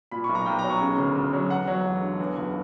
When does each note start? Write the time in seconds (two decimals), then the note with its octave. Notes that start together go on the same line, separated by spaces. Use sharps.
0.11 A#2 B5
0.24 B1 C#6
0.35 A#5
0.46 B1 G5
0.59 A#5
0.64 F#3
0.70 C#6
0.81 C#3
0.98 D2
1.15 D2
1.33 F#3
1.50 E2 F#5
1.68 F#3
1.85 E1
2.02 D3
2.20 E2
2.37 F#1